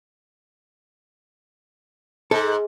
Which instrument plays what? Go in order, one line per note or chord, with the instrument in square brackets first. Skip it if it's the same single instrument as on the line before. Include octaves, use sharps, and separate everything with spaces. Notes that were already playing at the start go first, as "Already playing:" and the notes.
[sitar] G#2 [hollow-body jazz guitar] A4